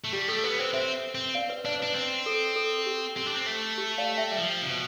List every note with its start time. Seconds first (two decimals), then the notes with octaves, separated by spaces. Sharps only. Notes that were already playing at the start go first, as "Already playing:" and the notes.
0.04 A3
0.13 G3 G4
0.28 A3 A4
0.44 B3 B4
0.55 B4
0.59 C4 C5
0.73 C4 C5 E5
1.15 C4
1.35 D5 F5
1.50 B4 D5
1.65 D4 B4 D5
1.80 D4 B4 D5
1.95 C4
2.26 A4
2.56 A4
2.78 A4
2.86 G4
3.17 C4
3.26 D4
3.34 C4
3.47 A3
3.78 G4
3.98 D5 F5
4.18 E5 G5
4.32 G3
4.38 F3
4.62 C3
4.69 B2